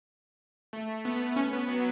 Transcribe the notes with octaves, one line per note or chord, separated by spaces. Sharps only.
A3
B3
C#4
B3
F#3